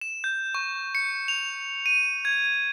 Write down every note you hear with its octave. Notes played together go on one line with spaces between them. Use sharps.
E7
G6
C#6
C#7
F7
D#7
G#6